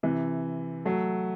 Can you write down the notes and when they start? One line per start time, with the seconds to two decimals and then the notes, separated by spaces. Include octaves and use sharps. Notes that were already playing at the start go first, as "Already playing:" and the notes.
0.03 C3 E3
0.85 F#3 A3